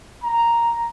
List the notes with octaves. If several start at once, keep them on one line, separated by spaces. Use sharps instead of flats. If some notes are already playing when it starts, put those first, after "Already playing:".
A#5